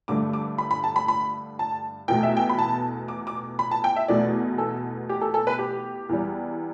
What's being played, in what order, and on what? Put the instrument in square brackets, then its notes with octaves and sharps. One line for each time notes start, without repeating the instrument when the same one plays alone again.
[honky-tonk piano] G2 D3 A3 D6
D6
B5
B5
A5
B5
B5
A5
E2 B2 A3 G5
E5
G5
B5
A5
D6
D6
B5
A5
G5
E5
E2 B2 A3 D5
A4
G4
A4
A4
B4
G4
E2 E3 G3